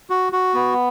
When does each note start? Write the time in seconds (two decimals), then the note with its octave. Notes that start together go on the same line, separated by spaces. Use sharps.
0.10 F#4
0.33 F#4
0.54 B3